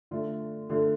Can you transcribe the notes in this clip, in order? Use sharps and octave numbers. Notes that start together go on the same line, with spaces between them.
D3 A3 F4
D3 A3 F4